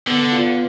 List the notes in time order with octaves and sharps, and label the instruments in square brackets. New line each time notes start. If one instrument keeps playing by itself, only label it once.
[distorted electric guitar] D3 [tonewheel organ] B3
[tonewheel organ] F4